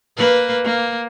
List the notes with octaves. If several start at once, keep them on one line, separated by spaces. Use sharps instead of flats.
A#3 B4
A#3